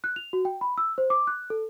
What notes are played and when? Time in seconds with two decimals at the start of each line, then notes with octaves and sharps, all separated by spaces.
0.04 F#6
0.16 F7
0.33 F#4
0.45 G5
0.61 B5
0.78 E6
0.98 C5
1.10 D6
1.27 F#6
1.50 A4